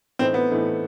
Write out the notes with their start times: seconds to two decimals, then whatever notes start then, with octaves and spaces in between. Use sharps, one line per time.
0.19 A2 E3 A3 C4 D#4
0.34 B3
0.50 A2 E3 A3 D#4